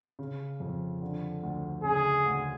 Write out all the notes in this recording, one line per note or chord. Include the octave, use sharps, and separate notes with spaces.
C#3
F2
D3
D2
C#3 G#4
D2